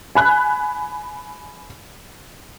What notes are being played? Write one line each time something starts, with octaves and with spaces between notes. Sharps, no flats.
G#5 B5 F#6